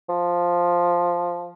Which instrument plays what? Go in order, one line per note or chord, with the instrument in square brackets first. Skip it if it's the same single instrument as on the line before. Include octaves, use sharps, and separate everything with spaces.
[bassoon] F3